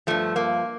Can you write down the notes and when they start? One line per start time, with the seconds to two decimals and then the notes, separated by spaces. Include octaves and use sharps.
0.07 G2 F3 A3
0.36 A#3